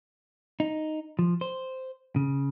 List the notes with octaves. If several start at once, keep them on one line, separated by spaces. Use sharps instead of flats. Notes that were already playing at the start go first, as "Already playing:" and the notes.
D#4
F3
C5
C#3